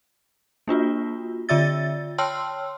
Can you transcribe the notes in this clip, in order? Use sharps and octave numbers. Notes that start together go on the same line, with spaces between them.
A#3 D4 F4 F#4
D3 F4 D5 E5 E6 A6
C#5 G5 A5 C6 E6 F6